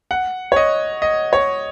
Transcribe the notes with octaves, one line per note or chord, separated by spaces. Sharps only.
F#5
C#5
D#5
D#5
C#5